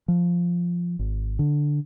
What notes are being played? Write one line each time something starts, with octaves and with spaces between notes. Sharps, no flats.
F3
G#1
D3